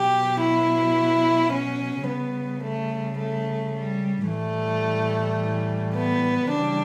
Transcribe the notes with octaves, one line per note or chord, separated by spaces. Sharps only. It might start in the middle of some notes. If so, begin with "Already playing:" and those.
Already playing: B2 F#3 G4
E4
C#4
C#3 G3 B3
A3
A3
G3
A2 E3 G3 A3
B3
C#3 E3 G3 D4